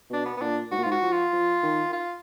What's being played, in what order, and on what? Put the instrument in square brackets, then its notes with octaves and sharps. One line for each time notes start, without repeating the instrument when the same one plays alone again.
[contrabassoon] B2 [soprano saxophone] D4
[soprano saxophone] B3
B3
[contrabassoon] A#2 [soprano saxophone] D4
[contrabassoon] G#2 [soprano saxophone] F#4
[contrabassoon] A#2
[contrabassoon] G#2 [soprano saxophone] F4
[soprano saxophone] F#4
[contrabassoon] F3
[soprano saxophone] F4
[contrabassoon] F3
D#3
[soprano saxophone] F4